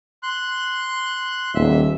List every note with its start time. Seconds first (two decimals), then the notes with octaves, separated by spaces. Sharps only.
0.23 C6 F#6
1.55 D#1 E5